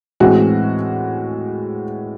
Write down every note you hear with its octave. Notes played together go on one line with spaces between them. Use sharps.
A2 E3 G#3 C4 F#4